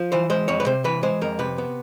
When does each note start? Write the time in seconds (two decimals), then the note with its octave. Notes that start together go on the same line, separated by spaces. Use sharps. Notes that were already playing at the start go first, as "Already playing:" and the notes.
Already playing: F3
0.12 E3 C5
0.30 G#3 C5
0.48 F2 C#5
0.60 B4
0.66 C3 C5
0.84 E3 B4
1.03 G#3 C5
1.21 F2 A#4
1.39 C3 B4
1.58 B3